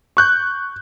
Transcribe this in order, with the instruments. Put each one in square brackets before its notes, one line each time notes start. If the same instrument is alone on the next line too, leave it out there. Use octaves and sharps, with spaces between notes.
[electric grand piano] C#6 F#6 G6